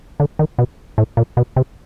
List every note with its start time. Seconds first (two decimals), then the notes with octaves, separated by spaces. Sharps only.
0.20 D3
0.39 D#3
0.59 B2
0.98 A2
1.17 A#2
1.37 B2
1.56 C3